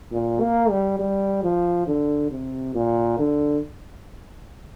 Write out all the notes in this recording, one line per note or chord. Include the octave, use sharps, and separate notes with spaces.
A#2
A#3
G3
G3
F3
D3
C3
A#2
D3